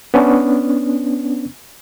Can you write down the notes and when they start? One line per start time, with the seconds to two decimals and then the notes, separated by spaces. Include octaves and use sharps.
0.14 B3 C#4 D4